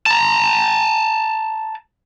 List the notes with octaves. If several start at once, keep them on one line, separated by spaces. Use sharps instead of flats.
A5 A#5